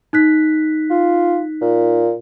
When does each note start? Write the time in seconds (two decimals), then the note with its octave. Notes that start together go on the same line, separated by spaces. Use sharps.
0.13 D#4 F#6 B6
0.90 F4
1.61 A#2